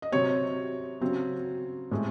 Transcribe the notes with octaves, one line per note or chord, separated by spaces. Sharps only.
D#5
C3 F#3 C4 C#5
C#3 F#3 C4
A2 G#3 C4